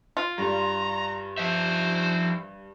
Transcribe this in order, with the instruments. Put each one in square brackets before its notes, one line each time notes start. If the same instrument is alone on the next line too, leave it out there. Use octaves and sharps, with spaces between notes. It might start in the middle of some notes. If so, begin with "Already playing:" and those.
[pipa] F4
[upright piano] G2 G3 [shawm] A#5
[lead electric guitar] F3 E5 [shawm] C5